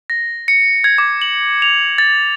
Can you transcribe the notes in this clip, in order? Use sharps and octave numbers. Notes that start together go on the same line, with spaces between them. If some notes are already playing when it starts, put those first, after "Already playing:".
A#6
C#7
G#6
D6
F#7
F7
A6